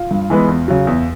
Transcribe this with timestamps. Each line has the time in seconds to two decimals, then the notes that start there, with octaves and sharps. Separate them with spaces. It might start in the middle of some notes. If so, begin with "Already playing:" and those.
Already playing: F4
0.11 G2
0.30 E3 G#3 B3
0.48 E2
0.68 C#3 F#3
0.87 E2